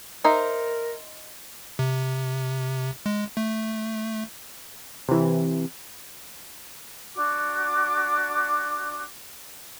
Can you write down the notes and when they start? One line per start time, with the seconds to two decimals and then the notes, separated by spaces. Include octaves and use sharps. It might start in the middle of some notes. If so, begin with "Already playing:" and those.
0.24 D#4 A#4 C5 E5
1.79 C3
3.06 G#3
3.37 A3
5.09 C3 E3
7.15 D4 F#4 D6